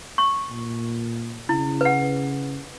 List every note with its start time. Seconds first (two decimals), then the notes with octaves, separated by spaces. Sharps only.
0.18 C#6
0.50 A#2
1.49 C#3 E4
1.81 B4 F#5